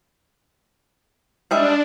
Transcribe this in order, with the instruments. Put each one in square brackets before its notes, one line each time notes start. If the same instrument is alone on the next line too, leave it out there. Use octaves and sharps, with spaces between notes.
[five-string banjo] G3 G#3 E5 [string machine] D4